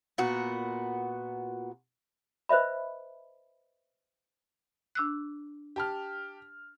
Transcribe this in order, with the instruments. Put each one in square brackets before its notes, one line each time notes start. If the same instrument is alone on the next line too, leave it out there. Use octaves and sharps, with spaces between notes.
[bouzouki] A#2 B3 F#4
[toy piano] B4 C5 D#5 E5 B5
[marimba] D4 E6 F#6
[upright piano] G4 A5 F6